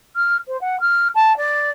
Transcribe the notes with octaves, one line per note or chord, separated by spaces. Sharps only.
F6
C5
F#5
F6
A5
D5